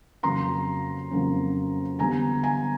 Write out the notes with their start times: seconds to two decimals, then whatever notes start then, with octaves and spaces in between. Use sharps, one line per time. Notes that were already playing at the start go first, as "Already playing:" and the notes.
0.23 F2 C#3 F#3 A#3 C#4 A#5 C6
1.11 F2 C#3 F#3 A#3 C#4
1.99 D3 G3 B3 G#5 A#5
2.43 G#5 A#5